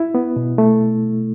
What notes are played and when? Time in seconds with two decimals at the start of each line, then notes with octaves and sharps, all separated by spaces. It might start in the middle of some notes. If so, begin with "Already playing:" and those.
Already playing: E4
0.15 B3
0.36 B2
0.58 A3